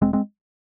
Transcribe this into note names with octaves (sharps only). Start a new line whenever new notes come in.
E1 G#3 C4
G#3 C4